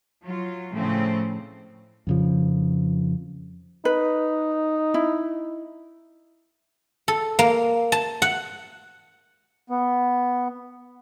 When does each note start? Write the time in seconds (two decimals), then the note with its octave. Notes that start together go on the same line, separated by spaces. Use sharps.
0.24 F#3 F4
0.74 A2 C#3 F3 A3 C4
2.07 F2 C#3 F3
3.85 D#4 B4
4.94 E4
7.08 A4
7.39 A#3
7.92 A5
8.22 F#5
9.70 B3